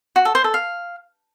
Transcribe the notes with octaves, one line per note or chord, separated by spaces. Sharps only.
F#4
A4
C5
A4
F5